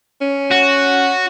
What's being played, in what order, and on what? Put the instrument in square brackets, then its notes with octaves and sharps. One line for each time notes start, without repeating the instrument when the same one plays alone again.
[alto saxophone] C#4
[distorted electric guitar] F#4